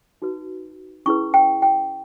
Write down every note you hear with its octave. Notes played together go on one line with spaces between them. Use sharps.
D#4 F#4 B4
C#4 E4 G#4 B4 C#6
G5
G5